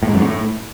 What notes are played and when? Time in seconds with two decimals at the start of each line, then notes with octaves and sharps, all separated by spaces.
0.03 A2
0.08 G#2
0.14 F#2
0.19 G#2
0.25 A2